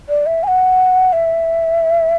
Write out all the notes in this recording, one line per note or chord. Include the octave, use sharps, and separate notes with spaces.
D5
E5
G#5
F#5
E5